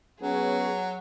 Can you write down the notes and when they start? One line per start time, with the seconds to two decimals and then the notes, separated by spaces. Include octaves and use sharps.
0.22 F#3 B3 C#4 G#4